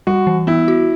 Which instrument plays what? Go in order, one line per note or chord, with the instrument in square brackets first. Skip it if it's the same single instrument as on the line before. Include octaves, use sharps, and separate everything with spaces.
[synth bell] G3 [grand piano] F#4
[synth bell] E3
[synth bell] B3 [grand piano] E4
[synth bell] F#4